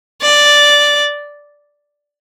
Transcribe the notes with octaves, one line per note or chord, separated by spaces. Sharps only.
D5